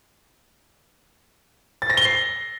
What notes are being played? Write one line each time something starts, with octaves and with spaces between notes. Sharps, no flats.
A6
A#6
G7
C7